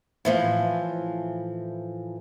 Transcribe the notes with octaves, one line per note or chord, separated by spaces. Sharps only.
A2 E3 F3